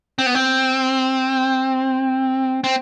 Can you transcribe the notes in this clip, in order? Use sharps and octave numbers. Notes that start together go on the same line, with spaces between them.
C4
B3
C4
C4